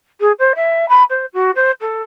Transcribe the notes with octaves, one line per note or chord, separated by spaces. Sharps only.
G#4
C5
E5
B5
C5
F#4
C5
A4